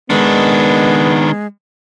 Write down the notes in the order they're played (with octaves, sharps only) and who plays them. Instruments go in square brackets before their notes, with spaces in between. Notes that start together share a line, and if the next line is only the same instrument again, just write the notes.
[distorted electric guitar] D#3 D4 [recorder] G#3 [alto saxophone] B3